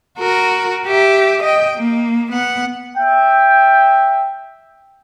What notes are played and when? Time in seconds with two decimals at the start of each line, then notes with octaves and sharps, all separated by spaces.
0.18 F#4 A#4
0.87 G4 E5
1.43 D#5 G5
1.78 A#3
2.32 B3 F#5
2.96 E5 G5